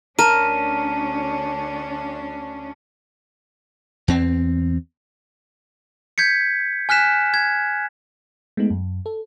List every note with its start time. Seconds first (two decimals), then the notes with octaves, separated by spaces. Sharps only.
0.19 D2 C#4 D4 A#4 A5 D#7
4.08 E2 C4
6.18 G6 G#6 B6 C#7
6.89 G#5 F6 F#6 B6 E7
7.34 G#6
8.57 G#3 A3 B3 D#4
8.70 F#2
9.06 A4